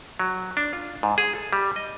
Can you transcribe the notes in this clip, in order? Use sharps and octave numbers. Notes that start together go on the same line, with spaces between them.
F#3
D4
F4
G#2
G#4
A4
G3
D#5